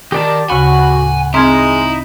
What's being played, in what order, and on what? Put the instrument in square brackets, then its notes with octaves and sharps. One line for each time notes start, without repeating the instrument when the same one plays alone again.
[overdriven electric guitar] D#3 [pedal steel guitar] G4 D5 A5
[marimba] D2 C#3 [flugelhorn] F#4 [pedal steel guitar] F#5 B5 C#6 [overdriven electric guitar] G#5
[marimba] A2 D6
[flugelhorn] G#3 [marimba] C4 F6 G#6 [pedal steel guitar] D#4 A#5 [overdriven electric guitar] E4